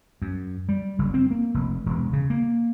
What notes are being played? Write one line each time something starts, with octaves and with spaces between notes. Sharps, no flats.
F#2
G3
F#1
C4
A#3
F1
E1
C#3
A#3